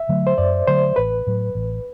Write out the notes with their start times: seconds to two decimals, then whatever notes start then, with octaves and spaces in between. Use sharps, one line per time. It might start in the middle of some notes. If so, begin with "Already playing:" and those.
Already playing: E5
0.09 D3 F#3 A3
0.27 C5
0.38 F#2 D5
0.67 D3 F#3 A3 C5
0.96 A1 B4
1.27 A2 F#3
1.55 A1